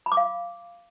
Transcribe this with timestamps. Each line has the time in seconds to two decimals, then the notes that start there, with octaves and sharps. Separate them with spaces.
0.06 B5
0.12 D6
0.17 F5